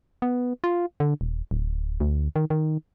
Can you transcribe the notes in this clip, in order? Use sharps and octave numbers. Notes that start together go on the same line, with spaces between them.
B3
F4
D3
D#1
D1
D2
D#3
D#3